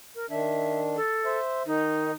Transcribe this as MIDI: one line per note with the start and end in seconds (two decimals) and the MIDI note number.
0.15 0.29 70
0.30 0.97 51
0.30 0.97 62
0.30 0.80 76
0.96 1.39 69
1.25 1.63 72
1.25 1.63 76
1.66 2.12 51
1.66 2.13 63